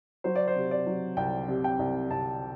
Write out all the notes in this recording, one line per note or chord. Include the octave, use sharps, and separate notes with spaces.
F#3 C5
D5
C5
C3
D5
F#3
C2 G5
C3
G5
C2
C2 A5